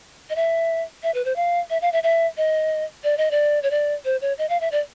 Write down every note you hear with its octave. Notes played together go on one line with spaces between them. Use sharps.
D#5
E5
E5
B4
C5
F5
E5
F5
E5
E5
D#5
D5
D#5
D5
C#5
D5
C5
C#5
D#5
F5
E5
D5